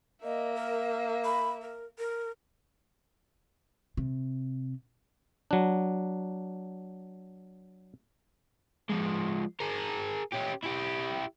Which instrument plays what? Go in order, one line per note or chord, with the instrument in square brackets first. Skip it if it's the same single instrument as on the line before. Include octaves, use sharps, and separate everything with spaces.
[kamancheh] A#3 E5 [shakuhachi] D#5
[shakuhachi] A#4
B5
A#4
A#4
[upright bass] C3
[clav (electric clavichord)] F#3 D4
[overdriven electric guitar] F3 G#3
G#4 A#4
C#4 G4
E4 G4